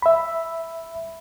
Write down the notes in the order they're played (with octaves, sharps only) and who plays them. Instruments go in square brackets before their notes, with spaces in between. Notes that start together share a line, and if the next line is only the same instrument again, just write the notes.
[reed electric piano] E5 B5